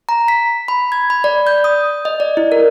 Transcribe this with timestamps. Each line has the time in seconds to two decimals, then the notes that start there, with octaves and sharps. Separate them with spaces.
0.09 A#5
0.28 B6
0.68 B5
0.92 G#6
1.10 B5
1.24 D5
1.47 G6
1.64 D#6
2.05 D#5
2.20 D5
2.37 E4
2.52 A#4